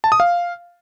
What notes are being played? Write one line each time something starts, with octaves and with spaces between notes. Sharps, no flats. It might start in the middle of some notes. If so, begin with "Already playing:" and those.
A5
D#6
F5